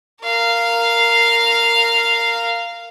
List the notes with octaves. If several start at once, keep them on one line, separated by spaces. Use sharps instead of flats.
A#4 F5